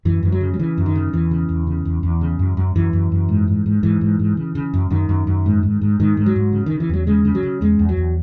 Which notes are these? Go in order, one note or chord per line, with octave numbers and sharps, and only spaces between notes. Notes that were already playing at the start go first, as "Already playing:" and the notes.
F#2 E3
F#2 E3
F#3
C#3
F#3
C#3 E3
F#2
D#3
C#3
E2 E3
C#3
E2
C#3
E2
E2
C#3
F#2
F#2
F#2 E3
F#2
F#2
G#2
G#2
G#2
G#2 E3
G#2
G#2
C#3
C#3
F#2
F#2 D#3
F#2
F#2
G#2
G#2
G#2
G#2 D#3
G#2
F#3
G#2
C#3
D#3
C#3
E3
E2 F#3
C#3 G#3
C#3
F#3
C#3
E2 G#3
E2
F#3
E2